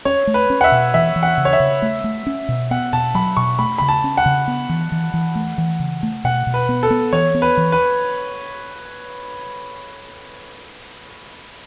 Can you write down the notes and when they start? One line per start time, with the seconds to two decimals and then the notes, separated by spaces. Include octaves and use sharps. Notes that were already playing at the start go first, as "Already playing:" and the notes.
0.05 C#4 C#5
0.27 A3
0.34 B4
0.50 C#4
0.61 F#5
0.64 E5
0.72 B2
0.94 E3 E5
1.16 E3
1.23 F#5
1.38 C#3
1.45 C#5
1.53 E5
1.60 C#3
1.82 A3
2.04 A3
2.27 C#4
2.49 B2
2.71 B3 F#5
2.93 B2 A5
3.14 F#3 B5
3.37 B2 C#6
3.59 A3 B5
3.78 C#3 B5
3.89 A5
4.04 C#4
4.17 F#5
4.26 C#3
4.48 B3
4.69 E3
4.92 E3
5.14 E3
5.35 A3
5.58 E3
5.80 C#3
6.03 A3
6.24 B2 F#5
6.47 B2
6.54 B4
6.69 B3
6.83 A4
6.90 B3
7.13 E3 C#5
7.35 B3
7.42 B4
7.57 E3
7.72 B4